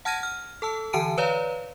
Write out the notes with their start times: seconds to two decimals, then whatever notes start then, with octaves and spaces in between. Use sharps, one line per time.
0.05 F#5 A5 F6 G#6 A#6 D#7
0.23 F6
0.62 A4 A5 E6
0.93 D3 E3 G#5 A5 D7 D#7
1.18 B4 C#5 D5 F5 A#5